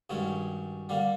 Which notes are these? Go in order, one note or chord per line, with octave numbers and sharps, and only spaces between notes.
G2 D#3 G#3 C#4 F#4
D3 G3 A#3